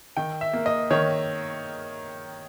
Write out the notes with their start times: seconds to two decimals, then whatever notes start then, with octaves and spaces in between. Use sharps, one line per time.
0.17 D#3 G5
0.41 E5
0.53 A#3
0.66 D#5
0.90 D#3 C#5